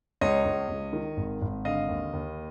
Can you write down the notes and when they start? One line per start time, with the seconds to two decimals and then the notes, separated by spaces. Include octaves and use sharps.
0.21 C#2 C#5 D#5
0.45 C#2
0.69 C#2
0.93 D#3
1.17 G#1
1.42 G#1
1.65 D3 D#5 F5
1.89 D#2
2.13 D#2